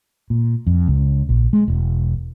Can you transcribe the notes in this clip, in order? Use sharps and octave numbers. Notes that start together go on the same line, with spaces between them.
A#2
F2
C#2
A#1
G#3
E1